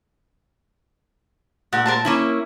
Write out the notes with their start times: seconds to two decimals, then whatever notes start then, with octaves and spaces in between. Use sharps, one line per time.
1.73 A#2 F#5 G#5
1.86 A#4 C5 A5
2.05 A#3 C#4 E4 G#5